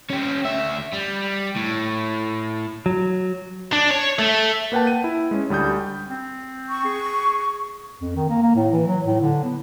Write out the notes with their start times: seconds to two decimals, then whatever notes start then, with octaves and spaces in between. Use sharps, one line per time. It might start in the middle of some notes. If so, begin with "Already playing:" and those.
0.10 C#4 G4
0.44 D2 E5
0.94 G3
1.57 A2
2.86 F#3
3.73 D4
3.91 C#5
4.19 A3
4.72 A#3 B4 F#5 G5 A5
4.87 D#7
5.04 E4
5.31 G#3 C#4
5.50 D2 G3 D#6 G6
6.09 C4
6.69 C#6
6.84 G#4
8.01 F2
8.16 D#3
8.29 A#3
8.42 A#3
8.56 A2
8.73 E3
8.87 F#3
9.05 A2
9.21 D3
9.44 B3